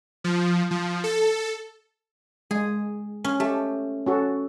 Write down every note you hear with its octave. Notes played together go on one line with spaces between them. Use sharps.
F3
F3
A4
G#3 G#4
C#4
A3 G4
C#4 F#4 A4